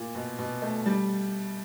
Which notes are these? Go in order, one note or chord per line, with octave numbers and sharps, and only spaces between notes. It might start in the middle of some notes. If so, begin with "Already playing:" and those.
Already playing: A#2
B2
B2
A3
G3